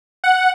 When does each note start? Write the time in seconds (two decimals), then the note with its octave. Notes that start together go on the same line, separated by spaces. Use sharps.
0.24 F#5